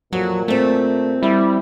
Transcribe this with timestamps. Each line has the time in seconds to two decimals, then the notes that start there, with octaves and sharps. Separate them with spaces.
0.13 F2 A#2 F#3 F#4
0.48 A3 C4 G4
1.23 G3 E4